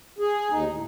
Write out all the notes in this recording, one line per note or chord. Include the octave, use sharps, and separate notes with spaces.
G#4
D#2 D#4
A2